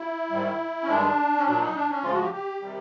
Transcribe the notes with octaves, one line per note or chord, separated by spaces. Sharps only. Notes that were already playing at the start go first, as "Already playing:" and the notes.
Already playing: E4
G#2 D#3 G3
C#4
G2 D#3 G#3 D4
C#4
A#2 F#3 D4
D#4
D4
C#4
D2 C#3 F3 G#3 F4
F#4
G4
G4
C3 D#3 G3